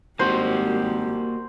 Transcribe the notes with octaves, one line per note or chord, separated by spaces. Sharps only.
G#1 G3 A#3 F#4 G4 C5